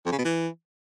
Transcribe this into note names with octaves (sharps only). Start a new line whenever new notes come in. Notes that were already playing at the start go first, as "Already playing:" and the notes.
F2
C#3
B2
E3